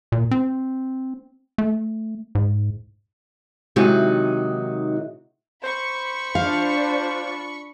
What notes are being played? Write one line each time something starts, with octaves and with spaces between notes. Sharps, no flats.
A#2
C4
A3
G#2
C3 D#3 F#3 G#3 D#4 F#4
C5 B5 C#6
D4 F4 F5